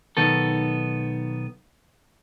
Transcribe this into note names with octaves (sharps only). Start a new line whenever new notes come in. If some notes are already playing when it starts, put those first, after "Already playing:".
B1 D#3 B3 A4